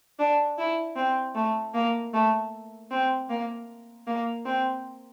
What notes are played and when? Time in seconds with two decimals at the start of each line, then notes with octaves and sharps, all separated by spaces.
0.19 D4
0.58 E4
0.96 C4
1.35 A3
1.74 A#3
2.14 A3
2.91 C4
3.29 A#3
4.07 A#3
4.46 C4